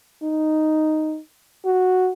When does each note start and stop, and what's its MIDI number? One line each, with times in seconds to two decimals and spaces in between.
0.23 1.19 63
1.66 2.11 66